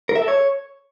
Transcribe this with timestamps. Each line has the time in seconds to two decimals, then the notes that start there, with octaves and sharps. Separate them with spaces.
0.09 A#4
0.16 E5
0.22 A4
0.28 C#5